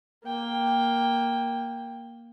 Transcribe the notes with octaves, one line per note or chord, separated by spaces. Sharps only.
A#3 G5